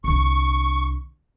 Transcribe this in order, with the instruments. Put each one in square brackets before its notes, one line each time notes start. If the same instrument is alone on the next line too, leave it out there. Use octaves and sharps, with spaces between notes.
[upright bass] C2 D3 [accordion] C#6